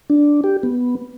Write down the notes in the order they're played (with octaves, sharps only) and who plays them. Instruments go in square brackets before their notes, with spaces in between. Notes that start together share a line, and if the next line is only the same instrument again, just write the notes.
[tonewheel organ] D4
G4
B3